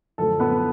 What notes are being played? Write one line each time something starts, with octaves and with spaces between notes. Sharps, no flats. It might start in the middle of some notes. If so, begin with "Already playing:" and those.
F#2 D3 F3 A3 A4
B3 B4